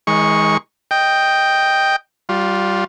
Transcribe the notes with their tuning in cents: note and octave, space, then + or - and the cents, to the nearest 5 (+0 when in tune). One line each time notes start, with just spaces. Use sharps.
D#3 +45 G#3 +0 C#6 +0
D#5 +0 G5 +0
G3 -20 F4 +15